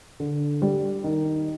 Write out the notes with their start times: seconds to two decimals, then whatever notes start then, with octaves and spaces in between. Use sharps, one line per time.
0.20 D3
0.62 G3
1.04 D#3